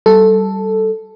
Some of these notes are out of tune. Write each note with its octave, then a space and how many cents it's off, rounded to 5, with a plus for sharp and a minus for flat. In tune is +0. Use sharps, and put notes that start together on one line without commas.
G3 -25 A4 +0